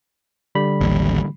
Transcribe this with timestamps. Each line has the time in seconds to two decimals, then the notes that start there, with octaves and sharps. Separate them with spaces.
0.55 D3 G3 B5
0.81 A1 D#2